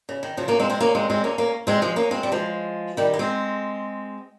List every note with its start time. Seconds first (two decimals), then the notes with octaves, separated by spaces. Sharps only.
0.09 C#3
0.23 D#3
0.37 C#3 F3
0.48 A#3 C#4
0.59 G#3 C4
0.70 G#3 C4
0.81 A#3 C#4
0.95 G#3 C4
1.10 G#3 C4
1.24 A#3 C#4
1.38 A#3 C#4
1.67 G#3 C4
1.82 F3 G#3
1.96 A#3 C#4
2.11 G#3 C4
2.23 G3
2.32 F3 G#3
2.97 D#3 G3
3.14 A#3
3.19 G#3 C4